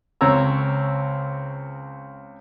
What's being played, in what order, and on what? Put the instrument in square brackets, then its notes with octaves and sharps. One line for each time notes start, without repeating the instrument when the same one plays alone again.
[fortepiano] C#2 C4 C#5 A#5 E6